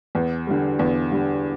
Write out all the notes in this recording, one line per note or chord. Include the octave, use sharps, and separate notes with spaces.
E2
D3 G3
E2
D3 G3